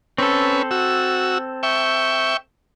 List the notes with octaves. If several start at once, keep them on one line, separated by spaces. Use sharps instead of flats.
C4 C#4 A4 B4
F#4 E6
E5 G5 C#6